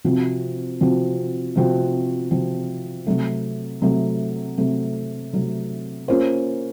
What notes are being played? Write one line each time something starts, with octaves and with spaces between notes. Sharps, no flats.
C3 F3 C4 F#4
C3 F3 C4 F#4
C3 F3 C4 F#4
C3 F3 C4 F#4
C3 F#3 A3
C3 F#3 A3
C3 F#3 A3
C3 F#3 A3
A#3 C#4 F4 C5